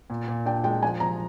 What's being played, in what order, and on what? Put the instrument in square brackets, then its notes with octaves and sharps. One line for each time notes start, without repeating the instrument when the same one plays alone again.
[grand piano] A#2
A#2
[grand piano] D4 [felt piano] G5
[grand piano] G#3 [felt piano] G5
[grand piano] F3 [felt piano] G#5
[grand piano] F3 [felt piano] A#5